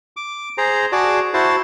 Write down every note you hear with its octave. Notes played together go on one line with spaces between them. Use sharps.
D6
G#4 C5 A#5
F#4 G#4 D5 A5
E4 F#4 C5 A5